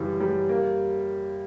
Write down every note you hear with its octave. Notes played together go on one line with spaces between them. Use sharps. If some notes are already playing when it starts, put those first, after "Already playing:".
Already playing: F#2 C#3 E3 G3
G3
A#3